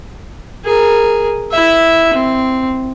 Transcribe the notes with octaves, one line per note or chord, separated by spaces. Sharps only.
G#4 A#4
E4 E5
C4